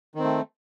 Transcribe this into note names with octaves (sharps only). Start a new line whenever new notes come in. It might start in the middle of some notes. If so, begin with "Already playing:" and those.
D#3 A3 C4